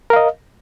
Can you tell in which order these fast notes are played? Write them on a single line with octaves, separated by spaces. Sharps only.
A#4 F5 D#5